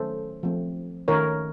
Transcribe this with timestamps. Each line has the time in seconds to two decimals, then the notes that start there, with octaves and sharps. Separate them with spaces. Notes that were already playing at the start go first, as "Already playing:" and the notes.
Already playing: D#3 F#3 A3 C#4 A4 C5
0.43 F3 A3 C4
1.08 D#3 A3 C#4 A#4 C#5